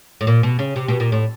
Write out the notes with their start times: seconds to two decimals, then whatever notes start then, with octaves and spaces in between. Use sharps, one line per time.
0.21 A2
0.27 A#2
0.43 B2
0.59 C#3
0.76 C3
0.88 B2
1.00 A#2
1.12 A2